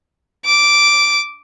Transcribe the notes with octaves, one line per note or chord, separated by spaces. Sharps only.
D6